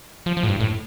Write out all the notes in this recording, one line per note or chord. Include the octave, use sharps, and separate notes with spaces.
F3
F3
A2
G2
A2